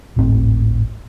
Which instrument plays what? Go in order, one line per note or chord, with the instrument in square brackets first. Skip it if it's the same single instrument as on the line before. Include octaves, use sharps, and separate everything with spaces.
[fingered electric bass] D1 G#1 A2 C4